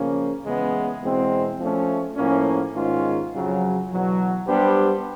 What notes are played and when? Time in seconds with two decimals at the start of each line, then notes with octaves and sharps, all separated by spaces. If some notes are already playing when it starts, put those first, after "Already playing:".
Already playing: C#3 F3 A#3 C#4
0.44 E2 C#3 E3 G#3 B3
1.01 E2 B2 G#3 C4
1.59 F3 A3 C#4
2.16 A2 F3 A#3 C#4
2.74 G#2 D#3 G#3 C#4 F4
3.32 F2 C#3 F#3
3.90 E2 B2 F#3
4.47 G3 B3 D4 G4 C5